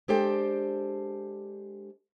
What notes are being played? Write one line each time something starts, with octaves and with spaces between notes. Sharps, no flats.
G#3 D4 G4 A4 C5 G5